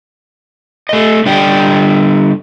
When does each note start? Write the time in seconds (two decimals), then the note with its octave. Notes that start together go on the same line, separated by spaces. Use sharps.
0.89 A3 D#5
1.26 D3 G3 D5 D#5 G5